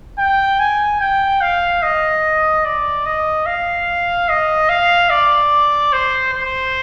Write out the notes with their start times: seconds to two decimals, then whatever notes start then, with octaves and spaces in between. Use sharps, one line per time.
0.19 G5
0.59 G#5
1.00 G5
1.41 F5
1.83 D#5
2.65 D5
3.06 D#5
3.46 F5
4.29 D#5
4.69 F5
5.10 D5
5.93 C5
6.33 C5